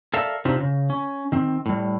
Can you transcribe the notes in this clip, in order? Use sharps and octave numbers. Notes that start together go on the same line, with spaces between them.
A4 A#4 D5 E5 F5
C3 C4 D4 D#4 F4 G4
C#3
C#4
D#3 C4
A2 G3